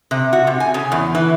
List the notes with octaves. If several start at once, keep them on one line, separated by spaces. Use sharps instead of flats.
C3
F#4
C3
G#5
C#3
E2
E3